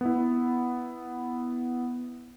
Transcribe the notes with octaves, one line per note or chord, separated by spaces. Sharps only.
B3 E4